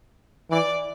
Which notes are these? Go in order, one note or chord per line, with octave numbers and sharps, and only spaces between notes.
E3 D5 D6